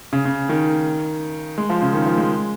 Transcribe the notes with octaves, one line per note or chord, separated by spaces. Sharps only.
C#3
C#3
D#3
G#3
F3
C#3
D#3
F3
G#3